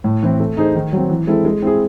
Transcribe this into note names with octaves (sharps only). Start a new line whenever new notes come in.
A2
E3 C4 E4
A3
D#4 G#4 C5
D#3
F#3 C4
E3
G#3 C4 E4 A4
G#3
C4 E4 G#4